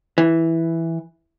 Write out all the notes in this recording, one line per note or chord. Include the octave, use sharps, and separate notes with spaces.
E3